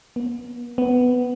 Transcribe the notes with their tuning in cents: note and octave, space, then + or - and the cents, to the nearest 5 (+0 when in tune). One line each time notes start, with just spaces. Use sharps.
B3 -45
B3 +10